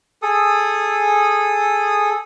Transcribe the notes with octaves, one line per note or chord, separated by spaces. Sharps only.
G#4 A4 D#6